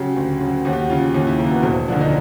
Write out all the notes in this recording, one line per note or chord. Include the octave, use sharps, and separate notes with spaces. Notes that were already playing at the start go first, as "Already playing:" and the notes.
Already playing: C#3 F#3 G4
D2
C#3 F#3
D#2 F#4
G4
F#4
C#3 F#3 F4
D#2
E4
C#3 F#3 A#3
B3
E1 C4
C4
D2 D3 F3 D4
D#4